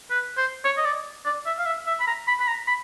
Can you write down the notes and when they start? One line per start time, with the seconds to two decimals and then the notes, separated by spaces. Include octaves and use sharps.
0.10 B4
0.37 C5
0.64 C#5
0.77 D#5
0.85 D5
1.25 D5
1.46 E5
1.58 F5
1.66 E5
1.86 E5
2.00 B5
2.07 A#5
2.27 B5
2.39 B5
2.47 A#5
2.67 B5